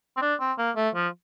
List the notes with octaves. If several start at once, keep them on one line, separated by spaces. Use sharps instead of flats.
C4
D4
C4
A#3
A3
F3